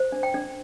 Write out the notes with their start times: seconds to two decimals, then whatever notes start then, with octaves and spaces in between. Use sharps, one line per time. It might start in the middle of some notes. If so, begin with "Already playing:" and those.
Already playing: C5
0.12 D4
0.23 G5
0.34 D4